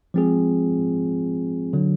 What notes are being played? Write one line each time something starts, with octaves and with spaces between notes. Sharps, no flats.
F3 G#3 C4 F4 G#4
D3 F#3